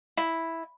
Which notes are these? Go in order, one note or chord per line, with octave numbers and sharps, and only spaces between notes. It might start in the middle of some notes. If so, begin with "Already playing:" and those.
E4